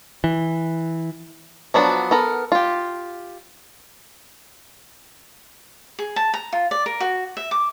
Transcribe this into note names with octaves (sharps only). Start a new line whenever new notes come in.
E3
F3 F#3 B3 D4
B3 A4 A#4
F4 G4
G#4
A5
A#5
F4
D5
A#4
F#4
E5
D6